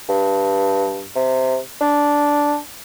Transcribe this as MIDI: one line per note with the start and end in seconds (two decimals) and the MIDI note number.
0.09 1.05 43
1.16 1.58 48
1.81 2.57 62